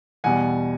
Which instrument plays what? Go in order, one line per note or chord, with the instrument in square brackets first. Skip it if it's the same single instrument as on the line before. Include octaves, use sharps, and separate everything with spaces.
[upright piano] E2 B2 G3 F#5 G#5